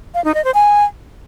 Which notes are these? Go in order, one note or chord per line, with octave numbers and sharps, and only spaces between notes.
F5
D#4
D#5
C5
G#5